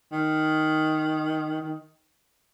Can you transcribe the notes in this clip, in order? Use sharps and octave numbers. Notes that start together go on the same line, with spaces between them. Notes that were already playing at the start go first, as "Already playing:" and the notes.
D#3
D#3